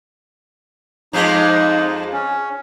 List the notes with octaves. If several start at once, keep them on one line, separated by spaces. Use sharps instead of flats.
F2 F3 G#3 D#4
C#4